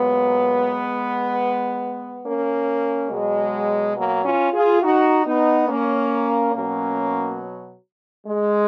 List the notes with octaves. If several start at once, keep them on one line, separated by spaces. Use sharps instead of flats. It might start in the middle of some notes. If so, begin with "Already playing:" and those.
Already playing: A#2 F#3 G#3 B3
A#3 C#4
B2 F#3 G#3
F#3 A#3
C#4 F4
F4 G#4
D#4 F#4
B3 D#4
A#3 C#4
B2 F#3 A#3 C#4
G#3